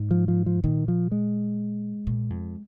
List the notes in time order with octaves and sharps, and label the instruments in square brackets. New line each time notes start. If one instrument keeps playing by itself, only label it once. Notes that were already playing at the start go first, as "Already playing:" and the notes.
Already playing: [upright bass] G#2
[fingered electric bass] F3
F3
F3
[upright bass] A#2 [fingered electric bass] D#3
[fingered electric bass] F3
G#3
[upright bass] A#2
F2